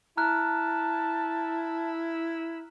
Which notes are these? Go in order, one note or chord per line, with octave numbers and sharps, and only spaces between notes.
E4 A5 A#5 F6 F#6